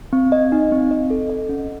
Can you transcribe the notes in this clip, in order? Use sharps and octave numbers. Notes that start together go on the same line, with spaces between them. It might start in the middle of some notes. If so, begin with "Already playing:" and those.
C4
D#5
D#4
C4
D#5
A4
D#5
C#4